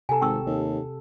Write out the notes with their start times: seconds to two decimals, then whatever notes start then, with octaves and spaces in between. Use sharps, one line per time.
0.09 C3 A4 G#5 A#5
0.21 G#1 G5 C#6 E6
0.46 D#2